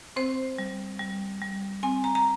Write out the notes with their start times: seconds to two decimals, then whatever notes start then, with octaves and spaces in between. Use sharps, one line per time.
0.16 C4 C5
0.58 G3
0.99 G3
1.42 G3
1.83 C4 G#5
2.04 A#5
2.15 A#5